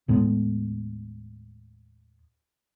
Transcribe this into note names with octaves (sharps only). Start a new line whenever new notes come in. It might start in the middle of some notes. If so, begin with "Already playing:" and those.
D#2 A2 G#3 B3